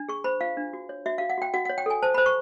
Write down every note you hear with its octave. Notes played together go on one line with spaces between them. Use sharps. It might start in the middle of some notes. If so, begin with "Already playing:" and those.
Already playing: D4
G#4 C#6
C5 B5
F4 F5
D4
F#4
C#5
F#4 E5
F#4 F5
F#5
F#4 G5
F#4 F#5
C#5 F#5
G5
A4 G#5
C5 A5
C5 B5
C#6